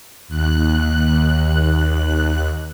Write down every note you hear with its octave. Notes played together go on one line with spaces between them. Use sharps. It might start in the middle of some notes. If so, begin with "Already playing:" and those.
D#2 F#6